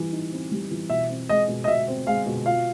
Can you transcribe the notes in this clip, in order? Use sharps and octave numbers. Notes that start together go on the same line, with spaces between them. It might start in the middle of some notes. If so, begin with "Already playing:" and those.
Already playing: E3 G3 C4
D#4
C4
G3
E3
B2 E5
C4
G#3 D#5
B2
D#5
B2 E5
C4
G#3 F5
B2
F4 F5